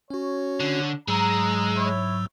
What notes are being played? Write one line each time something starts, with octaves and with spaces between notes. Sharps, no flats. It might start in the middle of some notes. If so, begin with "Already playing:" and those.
C#4 F#4 C#5
D3
G#2 F#3 G#3 A#5 E6
E4 C#5